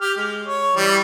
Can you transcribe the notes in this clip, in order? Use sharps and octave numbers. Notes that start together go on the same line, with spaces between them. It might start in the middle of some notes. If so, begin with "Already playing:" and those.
G4 F6
G#3
C#5
E3 G3